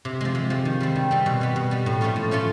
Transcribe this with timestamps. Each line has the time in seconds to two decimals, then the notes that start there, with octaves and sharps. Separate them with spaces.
0.05 C3
0.21 F3 G#3
0.35 C3
0.50 F3 G#3
0.65 D#3
0.80 G3 C4
0.96 D#3
1.11 G3 C4
1.26 B2
1.41 G3 B3
1.56 B2
1.71 G3 B3
1.86 A2
2.01 F3 A3 C#4 F4
2.16 A2
2.31 F3 A3 C#4 F4